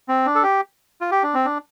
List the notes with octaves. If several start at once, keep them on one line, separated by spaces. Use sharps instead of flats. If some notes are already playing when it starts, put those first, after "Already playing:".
C4
D4
A4
G4
F4
G4
D4
C4
D4